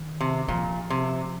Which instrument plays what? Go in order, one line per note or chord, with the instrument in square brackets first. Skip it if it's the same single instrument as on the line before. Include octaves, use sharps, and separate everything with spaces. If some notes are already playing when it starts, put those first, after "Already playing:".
Already playing: [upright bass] D#3
[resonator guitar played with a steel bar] C3
[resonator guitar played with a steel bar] A#2 [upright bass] F3
[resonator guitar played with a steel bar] C3